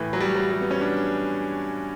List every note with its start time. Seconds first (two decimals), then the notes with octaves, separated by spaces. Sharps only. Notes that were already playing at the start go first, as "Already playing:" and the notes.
Already playing: A2 E3
0.13 F#3
0.20 G3
0.36 F#3
0.52 G3
0.61 B3
0.71 C#4
0.81 D4